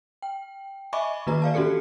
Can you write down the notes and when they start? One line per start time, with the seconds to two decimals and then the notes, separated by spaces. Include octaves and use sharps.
0.22 G5
0.93 D#5 E5 G#5 B5 C#6 D6
1.27 D#3 A#3 F#4 B4 A#5
1.42 D5 F5 A5
1.54 E3 C#4 F#4 G4 A4 C#7